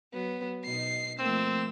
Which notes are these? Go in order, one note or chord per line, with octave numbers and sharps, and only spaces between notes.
F#3 B3
B2 D#4 C7
F3 A3 A#3 C4 E6